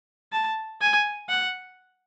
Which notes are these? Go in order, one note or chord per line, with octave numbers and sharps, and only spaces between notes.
A5
G#5
F#5